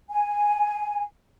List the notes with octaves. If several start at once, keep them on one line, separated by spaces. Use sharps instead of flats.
G#5